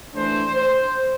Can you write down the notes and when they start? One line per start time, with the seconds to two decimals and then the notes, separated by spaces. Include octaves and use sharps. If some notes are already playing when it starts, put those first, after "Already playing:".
0.14 E3 A3 D4 C5
0.55 C5